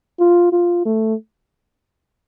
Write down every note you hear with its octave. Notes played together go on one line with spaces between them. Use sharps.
F4
F4
A3